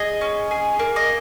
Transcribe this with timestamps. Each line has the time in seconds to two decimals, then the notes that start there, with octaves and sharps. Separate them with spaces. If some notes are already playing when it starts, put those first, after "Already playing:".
Already playing: G#4 D#5
0.21 C#4
0.51 G#4
0.79 A#3
0.96 D#5